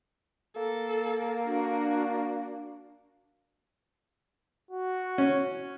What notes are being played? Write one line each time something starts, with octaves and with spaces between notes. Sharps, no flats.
A#3 A4
D4 F#4
F#4
C#4